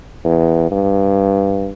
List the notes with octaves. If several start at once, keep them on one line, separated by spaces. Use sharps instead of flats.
E2
G2